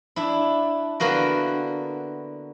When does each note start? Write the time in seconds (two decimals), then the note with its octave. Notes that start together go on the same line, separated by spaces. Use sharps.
0.16 D4 E4
1.00 D3 A#3 B3 F#4 A#4